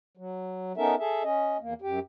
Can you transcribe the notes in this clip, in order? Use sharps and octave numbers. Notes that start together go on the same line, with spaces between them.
F#3
B3 C#4 D#4 A4 A#4 E5
G#4 A4 E5
C#4 D#5
E2 A#3
F#2 G4